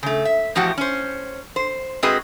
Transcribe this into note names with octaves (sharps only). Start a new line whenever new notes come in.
C#3 A3
E5
E2 A2 F3 F#4 G4 F#5
C#4 C5
C5
G#2 C4 F#4 G#4 B4 D#5